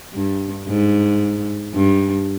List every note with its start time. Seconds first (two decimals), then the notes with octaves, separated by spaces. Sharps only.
0.13 G2
0.68 G#2
1.74 G2